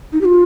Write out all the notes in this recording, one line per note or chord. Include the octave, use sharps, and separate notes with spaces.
D#4
G4
F4